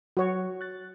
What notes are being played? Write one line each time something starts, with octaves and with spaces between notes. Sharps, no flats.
F#3 F#4 C#5
F#6 A6